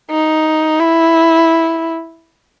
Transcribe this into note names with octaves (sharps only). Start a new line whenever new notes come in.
D#4
E4